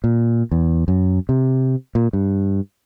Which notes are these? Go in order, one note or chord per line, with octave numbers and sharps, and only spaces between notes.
A#2
E2
F#2
C3
A#2
G2